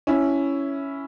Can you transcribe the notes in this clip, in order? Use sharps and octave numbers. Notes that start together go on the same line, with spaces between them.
C#4 E4